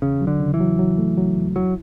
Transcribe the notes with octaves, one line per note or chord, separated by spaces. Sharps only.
E2 C#3
F#3
D3
C#3
E3
F#3
F#3
A3
F#3
E2
F#3 E4